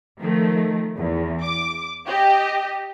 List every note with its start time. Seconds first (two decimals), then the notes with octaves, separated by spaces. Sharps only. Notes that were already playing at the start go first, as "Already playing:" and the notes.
0.20 D#3 F3 A3
0.98 E2
1.41 D6
2.07 G4 D#5